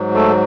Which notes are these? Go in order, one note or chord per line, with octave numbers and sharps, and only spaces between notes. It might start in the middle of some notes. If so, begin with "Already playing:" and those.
Already playing: G#2 F#3
A3 A4